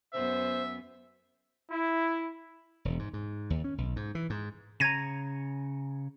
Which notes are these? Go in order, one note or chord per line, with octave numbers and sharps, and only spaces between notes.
F#2 B3 C5 E5
E4
E1
G#2
G#2
D#2
C#4
B1
G#2
E3
G#2
C#3 C#5 A#5 G#6 A#6 D#7